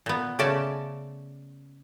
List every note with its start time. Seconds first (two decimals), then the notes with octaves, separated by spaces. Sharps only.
0.06 A#2 B3
0.39 C#3 A3 C#4 D5 A5